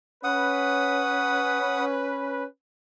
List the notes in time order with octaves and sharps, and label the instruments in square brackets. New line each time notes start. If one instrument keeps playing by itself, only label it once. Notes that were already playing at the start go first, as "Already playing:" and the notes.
[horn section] C#4 B4 [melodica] F#5 D#6